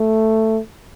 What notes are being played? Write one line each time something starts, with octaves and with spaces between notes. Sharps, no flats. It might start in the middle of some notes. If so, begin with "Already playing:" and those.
Already playing: A3